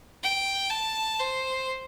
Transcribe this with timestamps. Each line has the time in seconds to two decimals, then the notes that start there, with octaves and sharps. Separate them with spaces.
0.23 G5
0.70 A5
1.20 C5